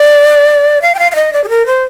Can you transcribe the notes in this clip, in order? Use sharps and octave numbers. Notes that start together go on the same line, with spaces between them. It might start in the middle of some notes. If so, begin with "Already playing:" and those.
Already playing: D5
F5
G5
F5
F5
D#5
D5
G#4
A#4
C5